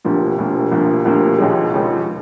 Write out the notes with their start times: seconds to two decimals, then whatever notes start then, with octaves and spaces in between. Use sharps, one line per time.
0.04 E1 D2 C3 F3 A#3
0.38 E1 D2 C3 F3 A#3
0.71 E1 D2 C3 F3 A#3
1.05 E1 D2 C3 F3 A#3
1.38 E1 D#2 C#3 F3 G#3
1.72 E1 D#2 C#3 F3 G#3